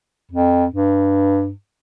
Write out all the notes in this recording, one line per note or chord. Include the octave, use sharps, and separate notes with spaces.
F2
G2